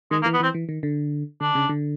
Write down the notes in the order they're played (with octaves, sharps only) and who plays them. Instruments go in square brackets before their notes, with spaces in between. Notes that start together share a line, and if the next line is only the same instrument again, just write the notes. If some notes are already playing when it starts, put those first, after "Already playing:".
[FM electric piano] D#3 [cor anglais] G#3
[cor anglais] A#3
[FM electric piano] E3
[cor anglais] B3
[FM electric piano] E3 [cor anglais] C4
[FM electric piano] E3
D#3
D3
[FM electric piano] D3 [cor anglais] D4
[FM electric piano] C#3
D3